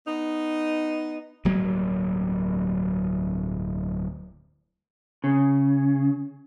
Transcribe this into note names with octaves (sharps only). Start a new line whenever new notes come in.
B3 D#4
D1 G2 F#3 A#3
C#3